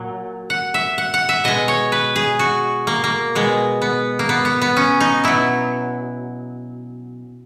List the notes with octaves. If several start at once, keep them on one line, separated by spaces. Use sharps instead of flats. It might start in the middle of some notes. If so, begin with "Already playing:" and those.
Already playing: A#2 F#3
F#5
E5
F#5
F#5
E5
B2 G#3 D#5
C#5
B4
G#4
F#4
A#3
A#3
B2 G#3
B3
A#3
B3
B3
B3
C#4
D#4
B2 F#3 E4